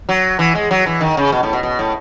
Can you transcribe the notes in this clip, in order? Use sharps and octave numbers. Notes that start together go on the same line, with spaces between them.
F#3
E3
G#3
F#3
E3
D#3
C#3
B2
A2
B2
B2
A2